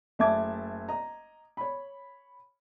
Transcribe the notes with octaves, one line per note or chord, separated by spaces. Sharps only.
F#1 A3 E5 A5 D6 G#6
D#5 A#5
C#5 B5